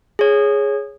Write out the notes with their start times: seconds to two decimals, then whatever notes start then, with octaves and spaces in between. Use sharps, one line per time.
0.19 G#4 C#5